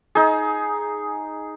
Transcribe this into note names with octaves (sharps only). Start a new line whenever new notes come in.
D#4 G#4